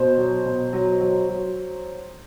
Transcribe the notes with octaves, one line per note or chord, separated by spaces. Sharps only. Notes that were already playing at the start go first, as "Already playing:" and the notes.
Already playing: B2 C5
F#3
B2
F#3
F#3
F#3